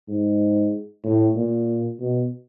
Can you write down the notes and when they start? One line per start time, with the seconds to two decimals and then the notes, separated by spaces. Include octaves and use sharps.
0.09 G#2
1.04 A2
1.36 A#2
2.00 B2